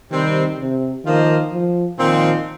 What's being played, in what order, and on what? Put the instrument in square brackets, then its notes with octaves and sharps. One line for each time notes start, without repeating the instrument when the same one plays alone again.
[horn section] C3 G3 C4 [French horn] D#3
[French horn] C3
[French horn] D#3 [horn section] F3 A#3 F4 C5 D#5
[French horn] F3
[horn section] A#2 F3 C4 [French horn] D#3